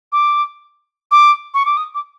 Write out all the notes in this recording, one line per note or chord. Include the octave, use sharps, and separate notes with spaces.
D6
D6
C#6
D6
D#6
D6